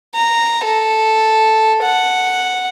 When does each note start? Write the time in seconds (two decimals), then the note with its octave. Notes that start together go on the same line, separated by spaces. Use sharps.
0.15 A#5
0.64 A4
1.83 F#5